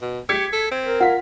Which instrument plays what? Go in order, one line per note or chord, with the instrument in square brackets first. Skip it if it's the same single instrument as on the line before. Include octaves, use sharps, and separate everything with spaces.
[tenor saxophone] B2
[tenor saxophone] G4 [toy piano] G#4 [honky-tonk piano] G#6 B6 C#7
[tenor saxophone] A4
C4
[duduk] A#4
[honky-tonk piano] F4 B6 [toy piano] F5 F#5